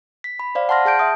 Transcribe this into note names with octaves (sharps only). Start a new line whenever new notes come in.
B6
B5
C5 D5 F5
F#5 A5 C6 F6 A#6
G#4 A5 G6 D7
E5 D#6